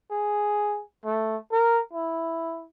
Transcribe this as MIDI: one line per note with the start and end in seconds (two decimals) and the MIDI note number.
0.11 0.82 68
1.05 1.36 57
1.52 1.81 70
1.93 2.65 64